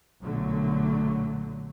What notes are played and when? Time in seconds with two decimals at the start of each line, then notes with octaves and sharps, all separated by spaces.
0.22 B1 A#2 D3 F#3 A3